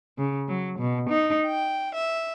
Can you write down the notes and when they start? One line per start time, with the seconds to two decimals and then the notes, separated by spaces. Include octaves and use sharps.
0.18 C#3
0.48 F#3
0.79 B2
1.10 D#4
1.46 G5
1.93 E5